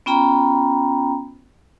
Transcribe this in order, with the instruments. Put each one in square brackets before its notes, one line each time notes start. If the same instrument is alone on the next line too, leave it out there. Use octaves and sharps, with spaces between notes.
[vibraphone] B3 C#4 F4 G5 A#5 B5